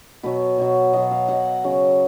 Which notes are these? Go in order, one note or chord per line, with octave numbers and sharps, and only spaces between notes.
B2 F#3 B4
B2 F#3
B2 F#3 D#5
F5
B2 F#3 F#5
C#3 F#3